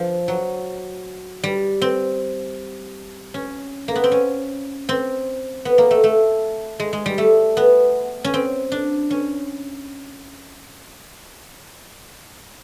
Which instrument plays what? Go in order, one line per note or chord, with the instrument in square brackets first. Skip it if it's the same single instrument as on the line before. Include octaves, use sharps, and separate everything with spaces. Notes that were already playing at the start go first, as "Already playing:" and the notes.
Already playing: [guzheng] F3
F#3
G3
C4
C#4
A#3
B3
C4
C#4
C4
B3
A#3
A3
A3
G#3
G#3
G3
A3
B3
C#4
C4
D4
C#4